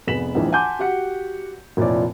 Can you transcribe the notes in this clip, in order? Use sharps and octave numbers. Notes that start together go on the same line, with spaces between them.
F1 B3 G#4 B6 E7 F#7
A#1 D#2 G#2 E3 F3
F#5 G#5 A5 C6 D6 G6
F#4 G4 F#5 C#7
F1 A#2 F3 E4 C#5 D5